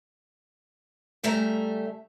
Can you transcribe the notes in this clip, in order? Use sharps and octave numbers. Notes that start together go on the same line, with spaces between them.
C#3 G3 A3 E5 A#5